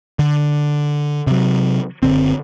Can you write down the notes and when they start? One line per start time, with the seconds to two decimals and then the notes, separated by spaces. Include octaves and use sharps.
0.19 D3
1.27 C3 F#3
2.03 F#1 C#2 D3 C4